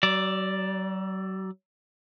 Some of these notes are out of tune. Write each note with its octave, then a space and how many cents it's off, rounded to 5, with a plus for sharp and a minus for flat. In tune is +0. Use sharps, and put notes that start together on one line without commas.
F#3 +40 D5 +0